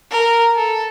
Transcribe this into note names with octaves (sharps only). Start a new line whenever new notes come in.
A#4
A4